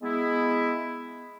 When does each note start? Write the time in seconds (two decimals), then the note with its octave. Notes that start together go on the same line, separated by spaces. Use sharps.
0.02 G#3 B3 E4